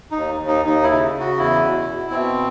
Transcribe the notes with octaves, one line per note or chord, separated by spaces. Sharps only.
D#2 D#4
D#2
D#4
D#2 D#4
E4
C#3
C#3
F#4
E2 E4
B2
B2
B2 C4